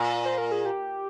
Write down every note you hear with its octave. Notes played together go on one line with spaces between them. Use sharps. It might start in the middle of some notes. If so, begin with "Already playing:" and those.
Already playing: A#2
C5
A#4
G#4
G4